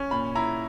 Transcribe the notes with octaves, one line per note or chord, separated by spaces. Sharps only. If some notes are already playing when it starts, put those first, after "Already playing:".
Already playing: C#4
A#2 B5
E4 A#5